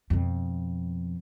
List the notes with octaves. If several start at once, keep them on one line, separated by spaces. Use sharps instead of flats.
F2 B2